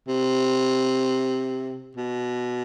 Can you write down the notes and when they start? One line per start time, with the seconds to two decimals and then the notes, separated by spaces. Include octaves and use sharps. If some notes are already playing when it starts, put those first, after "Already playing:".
0.08 C3
1.96 B2